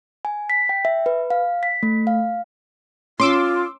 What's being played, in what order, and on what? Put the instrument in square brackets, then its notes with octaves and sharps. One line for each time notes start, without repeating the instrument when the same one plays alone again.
[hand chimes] G#5
B6
G5
E5
B4
F5
B6
A3
F5
[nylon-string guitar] C#4 [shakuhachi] F4 [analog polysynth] C6 D6 E6